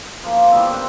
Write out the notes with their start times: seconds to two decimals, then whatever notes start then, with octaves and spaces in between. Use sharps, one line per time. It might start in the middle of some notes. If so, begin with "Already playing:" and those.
0.23 F3 A#3
0.37 D6
0.52 E3 G3 B3 C4
0.71 A#4 C5 F#5 G5